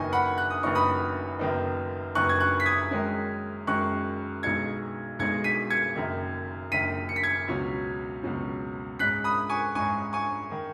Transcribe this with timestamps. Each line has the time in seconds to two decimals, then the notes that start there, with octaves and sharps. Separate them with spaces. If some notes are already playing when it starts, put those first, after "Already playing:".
Already playing: F#1 F#2 D#3 B3 D#4 G#5 C#6
0.13 F#5 B5
0.38 F#6
0.50 D#6
0.63 F#1 F#2 D#3 B3 D#4 C#6
0.75 B5 D#6
1.39 F#1 F#2 D#3 B3 D#4
2.15 F#1 F#2 D#3 B3 D#4 C#6 F#6
2.29 G#6
2.40 C#6 F#6
2.60 B6
2.66 D#6 G#6
2.91 F#2 D#3 G#3 C#4
3.67 F#2 D#3 G#3 C#4 C#6 F#6
4.43 B1 B2 G#3 D#4 G#6 C#7
5.19 B1 B2 G#3 D#4 G#6 C#7
5.44 B6 D#7
5.70 G#6 C#7
5.96 F#1 F#2 D#3
6.71 F#1 F#2 D#3 B6 D#7
7.09 C#7
7.16 B6
7.23 G#6 C#7
7.48 C#2 B2 F#3 C#4
8.23 C#2 B2 F#3 C#4
8.99 G#2 G#3 C#4 F#6 B6
9.24 B5 D#6
9.50 G#5 C#6
9.75 G#2 G#3 C#4 G#5 C#6
10.13 G#5 C#6
10.52 D#3